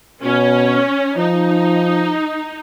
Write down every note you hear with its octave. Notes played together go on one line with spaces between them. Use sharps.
B2 C#4
F3 D#4